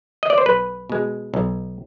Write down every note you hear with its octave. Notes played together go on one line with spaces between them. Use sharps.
D#5
D5
C5
B1 B4
B2 G#3
B1